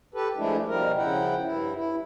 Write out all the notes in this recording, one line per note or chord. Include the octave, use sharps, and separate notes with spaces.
G4 A4 B4
F3 G#3 A3 D4 E4
B2 F3 G3 A#4
C#3 F3 E4 F#5 G5
G2 E4
E4